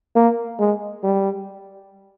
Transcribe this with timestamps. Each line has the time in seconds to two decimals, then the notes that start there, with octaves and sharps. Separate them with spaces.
0.16 A#3
0.60 G#3
1.04 G3